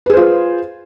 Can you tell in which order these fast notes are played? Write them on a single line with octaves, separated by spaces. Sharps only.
B4 G#4 C5 F4